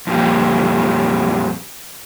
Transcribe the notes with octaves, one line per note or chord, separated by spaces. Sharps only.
F2 A#2 G3